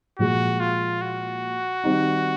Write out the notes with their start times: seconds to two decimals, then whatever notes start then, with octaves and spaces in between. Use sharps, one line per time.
0.19 A#2 F3 G#3 F#4
0.60 F4
1.01 F#4
1.84 D#3 G3 C4 D#4